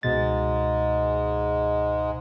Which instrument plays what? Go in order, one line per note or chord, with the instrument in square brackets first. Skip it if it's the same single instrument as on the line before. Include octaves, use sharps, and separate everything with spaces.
[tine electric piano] C#2 B2 A6 [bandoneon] G#2 G#3